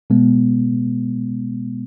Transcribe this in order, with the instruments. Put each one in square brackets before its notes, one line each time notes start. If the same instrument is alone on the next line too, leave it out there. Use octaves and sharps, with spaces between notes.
[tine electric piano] B2 G#3 B3